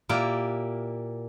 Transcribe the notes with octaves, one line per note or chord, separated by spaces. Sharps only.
A#2 A#3 E4 G4